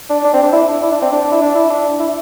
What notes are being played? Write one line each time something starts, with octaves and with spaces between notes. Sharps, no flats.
D4
D4
C4
D4
E4
D4
E4
D4
C4
D4
E4
D4
E4
D4
E4